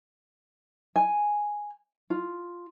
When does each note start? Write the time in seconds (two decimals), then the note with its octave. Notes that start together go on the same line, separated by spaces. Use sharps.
0.96 G#5
2.10 F4